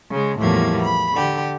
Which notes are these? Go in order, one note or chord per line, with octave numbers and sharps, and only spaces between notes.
C#3 G#3
E2 A2 F3 G3 A#3 G#6
B5
D3 G4